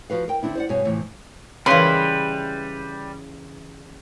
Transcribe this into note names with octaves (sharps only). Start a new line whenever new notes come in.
F3 F#4 B4 F5
A#4 G5
D3 C4 D4 E4
C5 D5 F#5
G2 B2 C#5 F5 G#5
E2 A2 C3 E3 F3
C#3 E3 G3 B4 C6